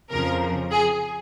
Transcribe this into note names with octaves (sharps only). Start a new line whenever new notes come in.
F2 C#3 F3 A#4
G#4